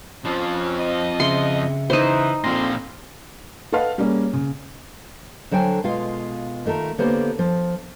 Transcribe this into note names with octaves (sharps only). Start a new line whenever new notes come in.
F2 F3 C#4
D#5
C#3 E5 C6 C#7
E3 D#4 C5
A#2 D3 F3 C4 C6 A#6
A4 B4 D#5 F5 F#5
G3 A#3 C#4 G#4
C#3
D3 F#3 C5 G5 G#5
B2 G#3 F4 F5
D#3 A3 F4 A#4
D3 A#3 B3 G4 C5 C#5
F3